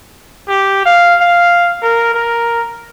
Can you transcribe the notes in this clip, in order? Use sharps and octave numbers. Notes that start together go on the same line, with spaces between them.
G4
F5
F5
A#4
A#4